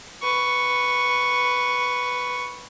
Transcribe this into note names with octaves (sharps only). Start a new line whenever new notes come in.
B4 C#6